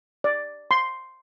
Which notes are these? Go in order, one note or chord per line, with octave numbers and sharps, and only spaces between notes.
D5
C6